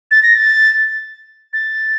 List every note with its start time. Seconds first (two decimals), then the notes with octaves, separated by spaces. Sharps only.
0.11 A6
0.23 A#6
0.35 A6
1.53 A6